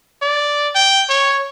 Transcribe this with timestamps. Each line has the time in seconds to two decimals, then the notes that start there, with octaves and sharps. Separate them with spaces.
0.22 D5
0.75 G5
1.09 C#5